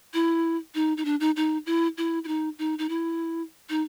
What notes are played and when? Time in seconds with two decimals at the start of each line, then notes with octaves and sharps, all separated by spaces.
0.14 E4
0.75 D#4
0.97 D#4
1.05 D4
1.20 D#4
1.36 D#4
1.66 E4
1.98 E4
2.24 E4
2.28 D#4
2.59 D#4
2.79 D#4
2.89 E4
3.70 D#4